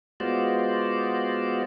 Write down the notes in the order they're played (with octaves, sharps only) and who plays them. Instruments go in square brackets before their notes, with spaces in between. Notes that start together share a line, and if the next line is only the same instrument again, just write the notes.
[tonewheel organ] G#3 B3 F4 F#4 C5 D5